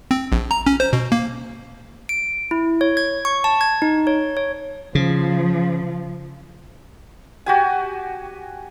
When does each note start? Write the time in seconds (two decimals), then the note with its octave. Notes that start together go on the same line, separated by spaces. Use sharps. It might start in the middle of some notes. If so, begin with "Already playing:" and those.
0.11 C4
0.32 A#1
0.51 A#5
0.66 C#4
0.80 C5
0.93 B2
1.12 A#3
2.09 D7
2.51 E4
2.81 C#5
2.97 G#6
3.25 C#6
3.44 A5
3.61 G#6
3.82 D#4
4.07 C#5
4.37 C#5
4.95 C#3 F3
7.46 F#4 G4 G#5